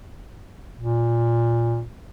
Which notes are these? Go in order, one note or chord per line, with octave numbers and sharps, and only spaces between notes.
A#2